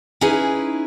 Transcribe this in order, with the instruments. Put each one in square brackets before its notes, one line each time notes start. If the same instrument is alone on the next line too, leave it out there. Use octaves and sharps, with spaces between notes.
[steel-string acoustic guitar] C#4 D#4 E4 G#4 B4